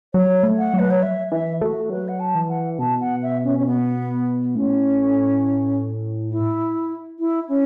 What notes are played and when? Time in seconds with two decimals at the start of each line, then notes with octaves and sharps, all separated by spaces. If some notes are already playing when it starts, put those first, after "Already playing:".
0.14 F#3 C#5
0.43 A3
0.59 F#5
0.74 F#3
0.79 B4
0.90 C#5
1.03 E5
1.32 E3 E5
1.61 A3 F#4
1.90 F#3 B4
2.08 F#5
2.20 A5
2.35 E3
2.49 F#5
2.79 B2 A5
3.00 F#5
3.23 E5
3.44 C#4
3.59 C#4
3.67 B3
4.55 A2 C#4
6.31 E4
7.19 E4
7.49 C#4